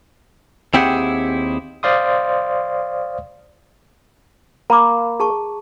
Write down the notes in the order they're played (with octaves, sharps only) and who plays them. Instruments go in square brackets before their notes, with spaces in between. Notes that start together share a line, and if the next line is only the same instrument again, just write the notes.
[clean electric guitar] D#2 C4 E4 G4 G#4 F#5
[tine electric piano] C5 D5 F5 C6 D#6
[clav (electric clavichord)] A#3 [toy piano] A#5 B5 D6
[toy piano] G#4 A5 C#6